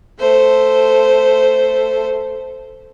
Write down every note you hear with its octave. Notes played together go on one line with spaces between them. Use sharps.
A3 C5